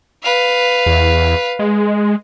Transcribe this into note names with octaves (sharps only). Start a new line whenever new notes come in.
B4 F5
E2
G#3